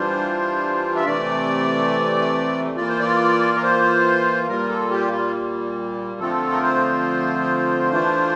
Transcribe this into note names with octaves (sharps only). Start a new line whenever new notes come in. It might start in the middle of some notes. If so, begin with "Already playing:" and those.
Already playing: E3 G3 D4 F4 C5
E5
C3 E3 A3 D5
E3 A#3 F4 D5
C5
D5
A#4
C5
A#2 G3 A#3 F4 A#4
A4
G4
F4
D3 F3 A3 C4 F4 A4
A#4
C5
E3 A3 D4 F4